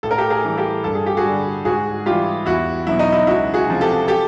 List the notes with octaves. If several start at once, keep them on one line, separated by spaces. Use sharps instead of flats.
A2 A4
A#4
G4 A4
G#4 A#4
E3 G3
G4 A4
G2 A4
G#4
G4
F#4 G#4
D3 G3
G#2 F#4 G#4
E3 G3 F4 G4
E2 E4 F#4
B2 F#3 E4
D#4
E4
C#2 E4 F#4
F#4 G#4
C3 F3
G4 A4
G4 A4